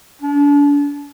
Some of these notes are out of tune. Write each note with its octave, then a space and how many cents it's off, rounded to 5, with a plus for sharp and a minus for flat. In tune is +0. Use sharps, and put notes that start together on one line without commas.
D4 -35